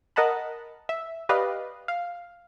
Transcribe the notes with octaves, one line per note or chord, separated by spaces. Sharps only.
A#4 D#5 F#5 A5 B5
E5
G4 B4 D5 D#5 F5
F5